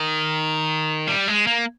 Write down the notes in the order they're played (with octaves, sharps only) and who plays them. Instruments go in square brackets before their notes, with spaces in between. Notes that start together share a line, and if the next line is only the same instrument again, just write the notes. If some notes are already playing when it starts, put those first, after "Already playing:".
Already playing: [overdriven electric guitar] D#3
G3
G#3
A#3